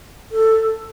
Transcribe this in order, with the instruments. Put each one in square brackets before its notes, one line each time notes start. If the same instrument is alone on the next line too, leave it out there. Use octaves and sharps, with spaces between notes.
[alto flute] A4